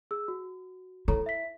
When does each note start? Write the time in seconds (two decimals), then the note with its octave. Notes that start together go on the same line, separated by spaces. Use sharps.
0.11 G#4 E6
0.28 F#4
1.08 E4 A4 C#5 A#5
1.26 E5 B6